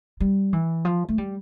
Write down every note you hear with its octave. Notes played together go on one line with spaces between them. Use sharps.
G3
E3
F3
A3
G3